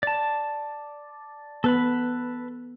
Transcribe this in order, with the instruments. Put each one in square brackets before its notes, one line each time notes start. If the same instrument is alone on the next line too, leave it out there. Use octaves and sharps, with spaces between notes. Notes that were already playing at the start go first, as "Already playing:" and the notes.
[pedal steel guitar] D5 A5
[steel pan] B3 [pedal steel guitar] A4 B4 B5